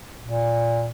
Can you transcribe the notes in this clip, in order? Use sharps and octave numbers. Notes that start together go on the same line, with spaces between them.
A#2